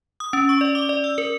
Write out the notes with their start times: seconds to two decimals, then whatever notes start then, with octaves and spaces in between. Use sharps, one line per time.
0.20 D#6
0.33 C#4
0.49 C#6
0.61 D5
0.75 D6
0.89 D5
1.04 E6
1.18 A#4